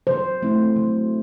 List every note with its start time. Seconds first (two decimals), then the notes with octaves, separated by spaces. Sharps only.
0.07 F#3 C5
0.42 A3 C4 E4
0.76 F#3